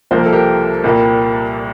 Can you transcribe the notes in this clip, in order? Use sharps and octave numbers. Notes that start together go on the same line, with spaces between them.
C2 C3 F3 A#3 C5
A#4
A4
G4 A#4
C2 A#2 G3 A#3